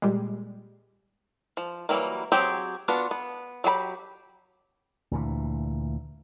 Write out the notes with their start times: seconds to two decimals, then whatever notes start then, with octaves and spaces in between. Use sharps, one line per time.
0.02 A#2 G3 G#3
1.57 F3
1.89 E3 F#3 G3 A#3
2.32 F#3 C4 G4 G#4
2.88 B3 D4 F4 F#4
3.11 B3
3.64 F#3 G4 G#4 B5
5.11 D2 A#2 E3